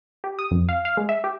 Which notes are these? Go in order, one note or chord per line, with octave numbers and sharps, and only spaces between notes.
G4
D#6
F2
F5
F5
G#3
E5
G4